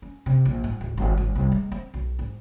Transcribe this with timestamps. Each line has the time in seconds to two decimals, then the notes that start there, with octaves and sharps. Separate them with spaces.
0.02 C#4
0.26 C3
0.45 A#1
0.64 G#2
0.81 D1
0.98 G#1
1.18 G#1
1.35 C2
1.52 G#3
1.72 C4
1.94 B1
2.19 G#2